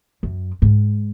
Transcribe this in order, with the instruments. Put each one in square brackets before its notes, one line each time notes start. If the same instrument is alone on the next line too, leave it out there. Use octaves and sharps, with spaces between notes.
[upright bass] F#2
G#2